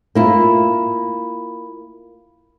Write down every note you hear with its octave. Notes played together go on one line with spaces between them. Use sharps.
A#3 E4 F4